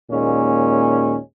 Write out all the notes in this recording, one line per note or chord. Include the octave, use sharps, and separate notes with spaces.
D#2 A#2 G#3 C#4